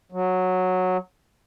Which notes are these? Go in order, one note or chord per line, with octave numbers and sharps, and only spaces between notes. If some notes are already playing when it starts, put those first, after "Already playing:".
F#3